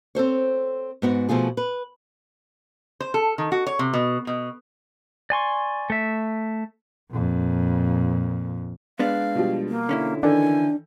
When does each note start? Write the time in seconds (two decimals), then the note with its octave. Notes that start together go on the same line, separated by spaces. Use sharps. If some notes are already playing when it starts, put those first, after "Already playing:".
0.15 C4 A4 C5 C#5
1.02 G#2 B3 F#4
1.29 B2 F3 A3 F4 G#4
1.57 B4
3.00 C5
3.14 A4
3.38 D#3
3.52 F#4
3.67 C#5
3.79 C3
3.93 B2
4.27 B2
5.30 D5 G#5 C6 C#6
5.90 A3 E5
7.10 F2 A#2
8.99 G#3 B3 D4 F5
9.35 B2 F3 G3
9.69 A#3
9.89 D3 C#4 E4
10.23 D#3 E3 D4 A4 G#5